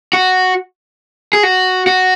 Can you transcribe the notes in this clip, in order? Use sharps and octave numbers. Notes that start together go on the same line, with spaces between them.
F#4
G#4
F#4
F#4